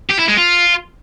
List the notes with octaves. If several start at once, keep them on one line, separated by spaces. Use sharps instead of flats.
G4
E4
G#3
F4